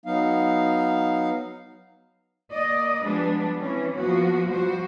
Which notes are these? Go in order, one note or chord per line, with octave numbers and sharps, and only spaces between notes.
F#3 B3 D#4 F5
A#3 D5 D#5
F3 G3 G#3 B3 D4 B4
E3 C4 C#4
F3 A#3 B3 F#4
F3 G3 F#4 C5